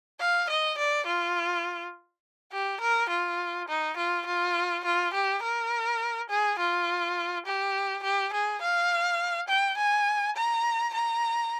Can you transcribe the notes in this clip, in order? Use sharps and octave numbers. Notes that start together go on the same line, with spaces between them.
F5
D#5
D5
F4
G4
A#4
F4
D#4
F4
F4
F4
G4
A#4
G#4
F4
G4
G4
G#4
F5
G5
G#5
A#5
A#5